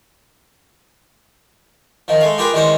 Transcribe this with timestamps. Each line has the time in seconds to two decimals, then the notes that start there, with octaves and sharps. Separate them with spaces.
2.08 D#3 F3
2.21 G#3 A3 F5
2.38 F4 G4 G#4 A#4 B4
2.53 D#3 E3 G3 G#3 C#4 C5